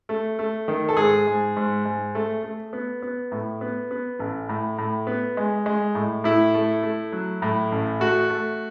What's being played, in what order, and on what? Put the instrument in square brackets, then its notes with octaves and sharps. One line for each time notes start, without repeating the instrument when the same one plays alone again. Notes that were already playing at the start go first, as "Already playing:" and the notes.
[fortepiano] A3
A3
D#3
A4
G#2 G#4
G#2
G#2
G#2
A3
A3
B3
B3
A2
B3
B3
A1
A2
A2
B3
G#3
G#3
A2
A2 E4
A3
A3
F#3
A2
A1
A3 F#4
A3